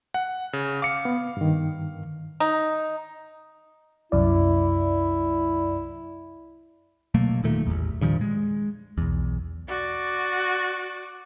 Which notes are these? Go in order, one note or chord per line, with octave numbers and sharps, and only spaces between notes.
F#5
C#3
F5 D6 C#7
B3
G2 D#3
D#4
C2 F#2 E4 D5
B2 F#3 A3 A#3
D#1 A#2 D#3 A3
A1 E2
G2 A#2 D#3 F3
G#3
B1 E2
F#4 D5